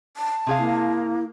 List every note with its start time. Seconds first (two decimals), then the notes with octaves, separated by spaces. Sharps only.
0.17 A5
0.47 C3 G#4 F5
0.58 A#3 E4